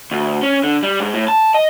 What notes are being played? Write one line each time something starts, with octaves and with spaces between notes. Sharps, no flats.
D2
C#4
D3
G3
G#2
A2
A5
D#5